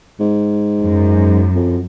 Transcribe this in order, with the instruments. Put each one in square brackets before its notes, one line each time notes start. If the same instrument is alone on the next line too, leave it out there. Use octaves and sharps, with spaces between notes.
[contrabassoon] G#2
[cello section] F#2
[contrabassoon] F2